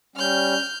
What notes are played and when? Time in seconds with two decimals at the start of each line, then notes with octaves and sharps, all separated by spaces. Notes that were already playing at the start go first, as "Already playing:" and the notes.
0.16 G3 C#4 F6 G6